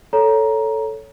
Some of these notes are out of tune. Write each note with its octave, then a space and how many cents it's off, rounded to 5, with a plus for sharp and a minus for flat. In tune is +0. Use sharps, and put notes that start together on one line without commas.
A4 +0 C#5 +10 A#5 +15